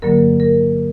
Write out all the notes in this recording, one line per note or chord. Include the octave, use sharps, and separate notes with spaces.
G2 D3 F#3 A#3 A#4
A#4